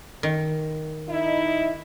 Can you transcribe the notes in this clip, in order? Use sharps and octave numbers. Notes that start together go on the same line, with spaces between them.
D#3
D#4 E4